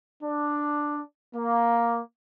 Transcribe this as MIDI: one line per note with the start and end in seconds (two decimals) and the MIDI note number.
0.24 1.00 62
1.36 2.01 58